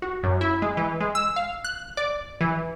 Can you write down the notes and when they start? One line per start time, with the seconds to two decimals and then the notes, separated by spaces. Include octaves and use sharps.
0.02 F#4
0.23 F#2
0.41 E4
0.62 G#3
0.77 E3
1.00 G#3
1.15 E6
1.36 F5
1.64 F#6
1.97 D5
2.41 E3